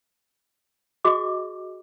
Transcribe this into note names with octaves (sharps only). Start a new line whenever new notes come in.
F#4 G#4 D#5 D6